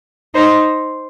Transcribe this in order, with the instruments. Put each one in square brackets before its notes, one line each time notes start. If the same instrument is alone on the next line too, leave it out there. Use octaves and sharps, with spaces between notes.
[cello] D#4 [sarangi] C5